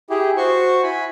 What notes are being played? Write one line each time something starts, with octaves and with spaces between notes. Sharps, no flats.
E4 G4 G#4
F#4 C5 C6 C#6
E4 G#5 B5